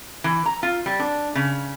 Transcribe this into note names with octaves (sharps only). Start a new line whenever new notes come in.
E3
A#5
F4
G3
D4
C#3